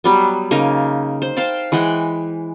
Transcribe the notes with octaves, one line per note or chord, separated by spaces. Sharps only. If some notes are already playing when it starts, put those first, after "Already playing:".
F#3 G3 B3
C#3 A#3 D#4
C5
C5 F5 G5 A5
E3 G#3 F#5 G5